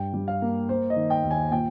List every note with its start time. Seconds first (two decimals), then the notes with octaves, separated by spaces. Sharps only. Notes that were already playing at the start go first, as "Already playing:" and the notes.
Already playing: G2 G5
0.13 G3
0.28 F5
0.42 A#3
0.69 A#3 C5
0.90 D#5
0.96 D#3
1.10 G5
1.23 D#2
1.31 G#5
1.51 A#2 G5